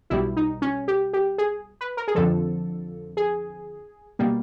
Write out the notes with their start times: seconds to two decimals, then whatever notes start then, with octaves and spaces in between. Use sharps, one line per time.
0.10 B1 B2 G3 E4
0.36 D#4
0.62 C#4
0.88 G4
1.13 G4
1.38 G#4
1.81 B4
1.97 A#4
2.08 G#4
2.15 F2 D3 F3 A4
3.17 G#4
4.19 B2 G3 A#3